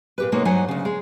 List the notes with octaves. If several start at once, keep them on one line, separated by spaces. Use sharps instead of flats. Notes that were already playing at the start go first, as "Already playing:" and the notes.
A#2 G4 B4
B2 G#3 A#3 D#4 C#5
G2 F#3 D#4 C5 F#5 G#5
D2 C#3
G#3